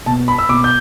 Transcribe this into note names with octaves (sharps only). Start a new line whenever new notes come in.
B2 A5
B5
E6
B2 D6
G6